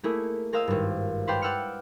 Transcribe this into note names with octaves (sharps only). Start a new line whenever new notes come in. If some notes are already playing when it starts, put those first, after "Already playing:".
A3 A#3 E4 G#4
G#4 A#4 C5 D#5 F5 E6
G#1 G2
B4 C5 D5 F5 G5 C6
D5 F#5 G5 E6 F6 C#7